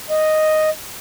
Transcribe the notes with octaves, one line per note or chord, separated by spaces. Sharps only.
D#5